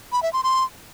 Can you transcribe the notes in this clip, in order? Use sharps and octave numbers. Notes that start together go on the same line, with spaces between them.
B5
E5
C6
C6